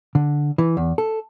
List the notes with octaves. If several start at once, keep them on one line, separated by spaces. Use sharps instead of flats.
D3
E3
E2
A4